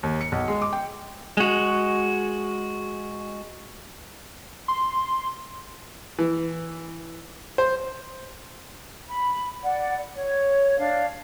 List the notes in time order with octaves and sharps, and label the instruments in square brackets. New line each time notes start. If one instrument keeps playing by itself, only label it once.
[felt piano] D#2
C#7
B1
G#3
D6
G5
[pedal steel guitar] G#3 F#4
[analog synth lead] C6
[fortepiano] E3
C5
[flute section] B5
D5 F#5
C#5
D4 F5